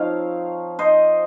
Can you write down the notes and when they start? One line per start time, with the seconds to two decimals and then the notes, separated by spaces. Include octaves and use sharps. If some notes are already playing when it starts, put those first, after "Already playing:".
Already playing: F3 C4 D#4 C#5 F5
0.79 C5 D#5